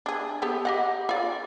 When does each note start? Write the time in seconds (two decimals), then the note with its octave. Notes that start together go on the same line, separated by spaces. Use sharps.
0.06 D4 G#4
0.42 B3 G4 A4
0.65 G4 D#5 F#5
1.09 F4 D5